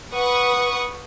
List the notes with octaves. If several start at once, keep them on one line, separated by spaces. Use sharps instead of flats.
B4 F#5 C#6 D#6